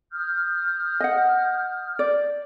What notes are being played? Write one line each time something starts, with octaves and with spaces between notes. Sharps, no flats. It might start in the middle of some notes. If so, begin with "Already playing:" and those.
D#6 F6 G6
D#5 F#5
D5